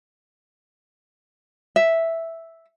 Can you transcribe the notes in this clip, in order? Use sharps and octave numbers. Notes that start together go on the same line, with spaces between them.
E5